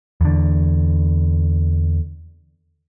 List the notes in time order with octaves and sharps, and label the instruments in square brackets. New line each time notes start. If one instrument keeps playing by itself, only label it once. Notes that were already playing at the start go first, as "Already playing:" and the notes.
[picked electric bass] E2 D3